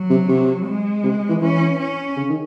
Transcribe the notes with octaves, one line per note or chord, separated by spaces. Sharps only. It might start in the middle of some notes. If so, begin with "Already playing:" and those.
Already playing: F#3
C3
C3
G#3
C3
E3
E3 C#4
C#4
C#3
D#3